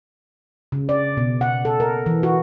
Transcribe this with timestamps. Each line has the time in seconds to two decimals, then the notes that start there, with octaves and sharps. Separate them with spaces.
0.72 C#3
0.89 D5
1.17 B2
1.41 F#5
1.65 A4
1.80 A#4
2.06 E3
2.23 F#4